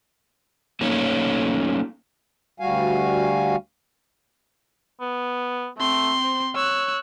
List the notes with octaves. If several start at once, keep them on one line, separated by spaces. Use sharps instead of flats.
F#3 A3 A#3 C#4 D#4 C#5
D2 G3 F#4 F5 G#5
B3
A3 C4 C6
C5
C#5 E6 F#6